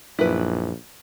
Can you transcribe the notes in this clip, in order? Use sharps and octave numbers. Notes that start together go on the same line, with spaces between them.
A#1 F#2 E4 B4